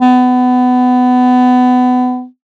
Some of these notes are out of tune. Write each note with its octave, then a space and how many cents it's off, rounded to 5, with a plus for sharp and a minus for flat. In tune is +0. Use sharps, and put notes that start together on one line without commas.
B3 +25